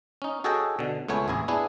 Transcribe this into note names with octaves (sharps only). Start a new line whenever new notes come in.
C#4 D#4
F#4 G#4 A4 C#5 D#5 G5
B2 D3
C#2 A3 B3 C#5 G#5
A1 E2 E4 G#4
B3 D4 E4 G#4